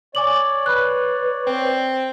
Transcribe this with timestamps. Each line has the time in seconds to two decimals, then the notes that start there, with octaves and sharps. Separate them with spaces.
0.15 C#5 D5 G#5 D6 F#7
0.66 B4 B5 F#6
1.47 C4